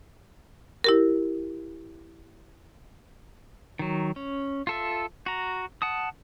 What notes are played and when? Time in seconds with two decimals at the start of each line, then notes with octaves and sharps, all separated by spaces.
0.84 E4 G4 A#4
3.79 D#3 F#3
4.16 C#4
4.67 F4 A4 E5
5.26 F#4 A#5
5.82 F#5 A5 D#6